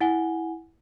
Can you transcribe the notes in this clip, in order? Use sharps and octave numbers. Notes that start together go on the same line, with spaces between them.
E4 F#5 G#5 G7